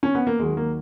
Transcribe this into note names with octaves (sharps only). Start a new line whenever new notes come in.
C#4
B3
A#3
D#2 D#3 F#3 G#3
A#3